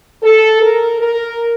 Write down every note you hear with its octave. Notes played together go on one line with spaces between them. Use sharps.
A4
A#4
A#4